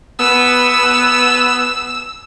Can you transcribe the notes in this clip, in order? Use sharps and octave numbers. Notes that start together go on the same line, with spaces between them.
B3 E6